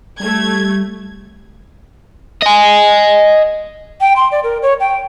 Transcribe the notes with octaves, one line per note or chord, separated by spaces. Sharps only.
G3 A3 G#6
D#5 G#5
G5
C6
D5
A#4
C#5
G5